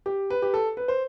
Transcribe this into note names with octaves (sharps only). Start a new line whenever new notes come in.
G4
B4
G4
A4
B4
C5